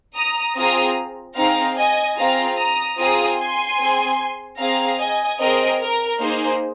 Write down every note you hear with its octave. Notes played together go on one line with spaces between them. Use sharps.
A#5 D#6
C4 F4 G#4 A#5 D#6
C4 D#4 G#4 F5 A#5
D#5 G#5
C4 F4 G#4 F5 A#5
A#5 D#6
C4 F4 G#4 A#5 D#6
G#5 C6
C4 G#4
C4 G#4 F5 A#5
D#5 G#5
C4 G#4 A#4 D#5
A#4
A#3 D#4 G#4 C5